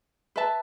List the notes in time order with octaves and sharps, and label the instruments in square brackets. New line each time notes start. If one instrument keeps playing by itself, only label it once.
[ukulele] B4 E5 A5